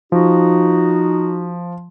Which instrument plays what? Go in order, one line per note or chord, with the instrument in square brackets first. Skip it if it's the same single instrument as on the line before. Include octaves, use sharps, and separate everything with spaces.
[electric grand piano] F3 [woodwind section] D#4 F#4